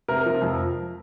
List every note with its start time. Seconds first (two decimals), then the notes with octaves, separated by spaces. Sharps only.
0.08 C3 A#4
0.26 F3
0.42 F2